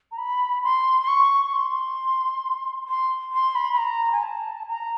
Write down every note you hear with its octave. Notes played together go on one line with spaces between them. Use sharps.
A#5
B5
C6
C6
C#6
C#6
C6
C6
C6
B5
B5
A#5
G#5
A5
A#5